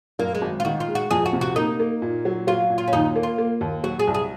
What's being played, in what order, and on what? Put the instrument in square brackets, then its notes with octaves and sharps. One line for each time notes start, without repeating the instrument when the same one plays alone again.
[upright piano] F#2 [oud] A#3
[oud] G#3
[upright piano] G#1
[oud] F4
[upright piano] D#3 [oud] F#4
[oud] F4
[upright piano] G#3
[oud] F#4
[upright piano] F2 [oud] G#4
[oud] F#4
[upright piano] C3
[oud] F#4
[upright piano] A#3 [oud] D#4
[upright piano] A#3
A#2
F#3
[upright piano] F#3 [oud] F4
[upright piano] A#2
[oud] F4
C#4
[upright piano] D#2 [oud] D#4
[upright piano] A#3
[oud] F4
[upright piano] A#3
D#2
[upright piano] F#3 [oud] F#4
[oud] G#4
[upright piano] C2
[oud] G#4